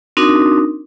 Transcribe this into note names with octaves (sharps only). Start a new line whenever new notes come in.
C4 D4 D#4 F#4 A#4